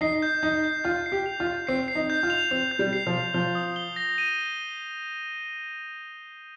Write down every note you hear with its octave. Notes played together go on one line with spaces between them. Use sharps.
D#4 C7
G6
D#4 G6
G6
F4 G6
C7
G4
F7
F4
G6
C4 C7
C7
D#4
G6
F4
F7
C4 F7
G6
G3
C7
F3
C7
F3 G7
D#6
G7
A#6
D#7